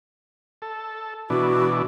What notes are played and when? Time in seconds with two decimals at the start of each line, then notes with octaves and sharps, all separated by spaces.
0.62 A4
1.30 B2 E3 D4 F#4